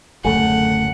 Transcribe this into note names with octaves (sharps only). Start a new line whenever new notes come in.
D1 F#2 C#3 A3 F#5 G#5